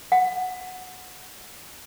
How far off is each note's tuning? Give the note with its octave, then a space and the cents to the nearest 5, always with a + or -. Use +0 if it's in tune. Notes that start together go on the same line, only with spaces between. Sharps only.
F#5 -5